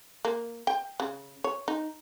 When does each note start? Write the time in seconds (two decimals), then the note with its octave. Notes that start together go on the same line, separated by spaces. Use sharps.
0.25 A#3
0.67 G5
1.00 C#3
1.44 C#5
1.68 D#4